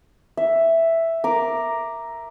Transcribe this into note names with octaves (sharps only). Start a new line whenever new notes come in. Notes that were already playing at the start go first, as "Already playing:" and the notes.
E5
A#4 D6